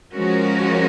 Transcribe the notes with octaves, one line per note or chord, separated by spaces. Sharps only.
F3 G#3 C#4 F#4 A#4